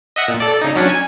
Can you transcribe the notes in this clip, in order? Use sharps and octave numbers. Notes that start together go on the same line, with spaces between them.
D#5 E5 F#5
A#2
A4 D5
C#3 D#4
F#3 C#4 D4
G#5